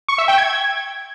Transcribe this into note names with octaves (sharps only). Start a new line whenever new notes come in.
C#6
E5
G5
G#6